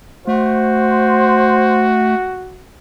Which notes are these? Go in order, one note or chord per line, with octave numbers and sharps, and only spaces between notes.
A3 F#4 C5